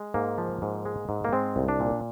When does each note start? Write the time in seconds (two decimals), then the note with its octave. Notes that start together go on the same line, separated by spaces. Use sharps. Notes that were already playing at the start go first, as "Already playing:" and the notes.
Already playing: G#3
0.14 G#2 A#3
0.38 F3
0.62 G#2
0.85 G#3
1.09 G#2
1.25 A#3
1.32 G#3 C4
1.56 C2
1.69 D4
1.80 A#2